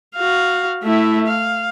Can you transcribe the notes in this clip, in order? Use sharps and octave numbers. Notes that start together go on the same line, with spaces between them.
F#4 F5
A3 E4
F5